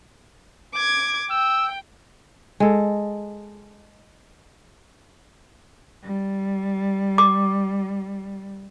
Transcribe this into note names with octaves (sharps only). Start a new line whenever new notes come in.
D6 G#6
G5 E6
G#3 A4
G3
D6